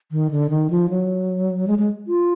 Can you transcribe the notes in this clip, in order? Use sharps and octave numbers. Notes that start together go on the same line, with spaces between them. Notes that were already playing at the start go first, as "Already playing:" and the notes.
D#3
D3
D#3
F3
F#3
G#3
G#3
F4